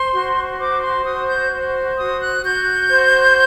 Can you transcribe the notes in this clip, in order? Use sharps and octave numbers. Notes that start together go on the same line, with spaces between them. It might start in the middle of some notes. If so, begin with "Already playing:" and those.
Already playing: C5 C6
F#4
C5 D6
C6
F#4 D#6
G6
C5
F#4 D#6
F#6
F#4 G6
C5